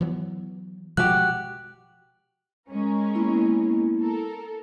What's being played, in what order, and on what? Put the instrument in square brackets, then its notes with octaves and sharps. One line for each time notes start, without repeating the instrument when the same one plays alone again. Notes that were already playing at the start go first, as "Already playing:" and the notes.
[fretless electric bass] E3 F#3 B3
[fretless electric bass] B2 F3 G#3 [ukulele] F#4 G4 [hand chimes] F#6
[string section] G#3 C#4 A#4
[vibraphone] A#3 B3 E4
[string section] A4 A#4